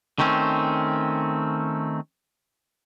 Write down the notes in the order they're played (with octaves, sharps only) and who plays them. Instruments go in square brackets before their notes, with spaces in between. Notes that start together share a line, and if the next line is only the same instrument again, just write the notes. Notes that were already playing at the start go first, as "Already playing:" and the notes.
[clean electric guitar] D#3 A3 C4 C#4